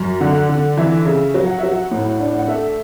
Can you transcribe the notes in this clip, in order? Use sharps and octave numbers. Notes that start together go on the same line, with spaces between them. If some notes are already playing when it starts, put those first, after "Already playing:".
Already playing: F#2
D3 F#5
D3
E3 E5
C#3
F#3
F#5
F#3 E5
F#5
A2
D4
F#5
A3 E5